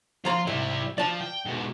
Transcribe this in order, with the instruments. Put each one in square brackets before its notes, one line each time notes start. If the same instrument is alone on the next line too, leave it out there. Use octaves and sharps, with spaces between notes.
[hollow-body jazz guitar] F3 A#5 C6 [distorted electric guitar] F4
[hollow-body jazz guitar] C2 G#2 [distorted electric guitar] G3 E4
[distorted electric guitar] F3 [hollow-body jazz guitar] D5 A5
[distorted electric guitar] G5
G#2 B2